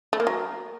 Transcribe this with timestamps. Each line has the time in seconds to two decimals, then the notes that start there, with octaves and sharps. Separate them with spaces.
0.13 A3
0.20 A#3
0.27 F#3